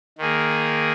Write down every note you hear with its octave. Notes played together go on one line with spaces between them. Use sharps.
D#3 A#3 G#4